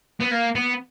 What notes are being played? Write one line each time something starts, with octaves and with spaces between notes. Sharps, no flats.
B3
A#3
B3